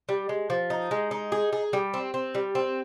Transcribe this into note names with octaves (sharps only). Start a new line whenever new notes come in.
G3
G#3
F3
D#4
G#3
D#4
G#4
G#4
G3
C4
C4
G3
C4